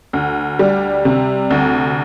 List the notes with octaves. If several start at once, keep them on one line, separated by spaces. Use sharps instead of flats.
D2
G3
C3
D2